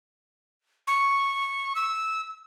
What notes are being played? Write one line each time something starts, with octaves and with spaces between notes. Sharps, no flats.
C#6
E6